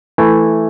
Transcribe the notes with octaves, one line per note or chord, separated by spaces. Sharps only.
E3 A3 E4